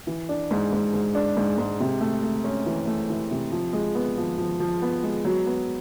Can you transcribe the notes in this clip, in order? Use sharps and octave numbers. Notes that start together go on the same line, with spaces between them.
E3
D4
G#2
G#2
G#2
D4
G#2
G#2
C3
A3
A3
C#4
E3
A3
E3
C3
F3
G#3
B3
F3
F3
F3
B3
G#3
F#3
B3